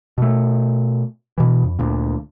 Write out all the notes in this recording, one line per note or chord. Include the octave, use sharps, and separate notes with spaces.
B2 A3
B2 E3
F2
D2 A#2